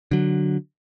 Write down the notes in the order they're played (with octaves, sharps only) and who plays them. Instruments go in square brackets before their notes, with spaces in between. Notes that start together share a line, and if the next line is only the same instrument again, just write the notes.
[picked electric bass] D3 F#3